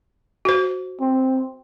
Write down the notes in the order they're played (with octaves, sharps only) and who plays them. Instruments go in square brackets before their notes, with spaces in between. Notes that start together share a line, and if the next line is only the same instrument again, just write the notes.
[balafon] F#4 C5
[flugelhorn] C4